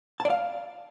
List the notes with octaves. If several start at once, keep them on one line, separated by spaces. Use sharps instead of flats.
A5
D5
F5